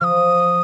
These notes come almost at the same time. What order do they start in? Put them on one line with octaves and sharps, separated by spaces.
F3 F6 D#6